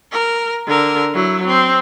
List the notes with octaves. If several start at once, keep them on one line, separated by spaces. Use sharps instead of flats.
A#4
D3 A#4
F#3 E4
C4